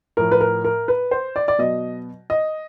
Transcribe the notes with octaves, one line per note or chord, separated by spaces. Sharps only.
A2 F3 A#4
B4
A#4
A#4
B4
C5
D5
D5
B2 F#3 D#5
D#5